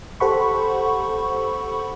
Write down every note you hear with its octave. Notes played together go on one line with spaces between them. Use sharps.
G4 A4 C5 F#5 B5 C#6